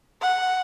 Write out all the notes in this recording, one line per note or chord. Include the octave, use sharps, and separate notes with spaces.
F#5